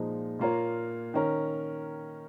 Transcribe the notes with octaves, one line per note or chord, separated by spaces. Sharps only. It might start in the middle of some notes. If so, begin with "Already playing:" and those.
Already playing: A#2 F3 G#3 D#4
A#2 A#3 F4 A#4 C#5
D#3 C#4 A#4